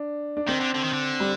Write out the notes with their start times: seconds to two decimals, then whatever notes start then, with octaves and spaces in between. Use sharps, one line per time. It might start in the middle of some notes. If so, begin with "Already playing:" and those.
Already playing: D4
0.37 D4
0.48 D#3 C4
0.61 D3
0.75 D3
0.84 D#3
0.93 D3
1.20 G3